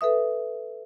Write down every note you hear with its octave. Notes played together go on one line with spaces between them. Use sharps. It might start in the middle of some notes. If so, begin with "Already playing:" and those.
A4 B4 E5 D#6